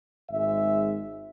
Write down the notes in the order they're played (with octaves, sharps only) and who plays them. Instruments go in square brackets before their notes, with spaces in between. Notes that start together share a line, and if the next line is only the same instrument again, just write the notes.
[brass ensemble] G#1 G#2 G#3 E5